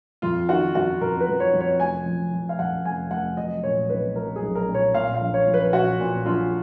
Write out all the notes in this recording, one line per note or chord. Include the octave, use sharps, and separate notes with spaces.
F2 F4
D#3 F#4
F2 F#4
F2 A#4
B4
F2
C#5
F2
C#5
F1 G#5
F3
F3
F5
F2 F#5
F1 G#5
F1 F#5
F#3 D#5
A#2 C#5
B1 B4
F#3 A#4
G#4
B1
A#4
A#2
C#5
A#2 F5
F5
A#1
C#5
F3
B4
A#2 F#4
A#2
A#1 F4